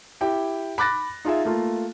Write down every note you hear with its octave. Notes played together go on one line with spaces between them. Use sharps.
E4 G4 G5
B5 D6 F#6 A6 A#6
D#4 F4 G#4 E5
A3 A#3 F4